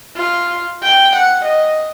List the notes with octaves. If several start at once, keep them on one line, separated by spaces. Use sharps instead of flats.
F4
G5
F#5
D#5